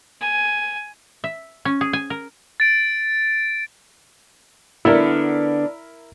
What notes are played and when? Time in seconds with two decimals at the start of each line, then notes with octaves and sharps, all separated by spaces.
0.21 G#5
1.24 E5
1.65 C#4
1.81 G#4
1.93 G#5
2.10 A#4
2.60 A6 D7
4.85 D3 B3 D4 E4 A#4